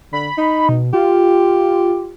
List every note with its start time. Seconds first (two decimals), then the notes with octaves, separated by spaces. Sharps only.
0.13 D3 B5
0.38 D#4
0.69 B2
0.93 F4 G4